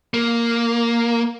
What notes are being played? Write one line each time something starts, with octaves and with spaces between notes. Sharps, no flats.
A#3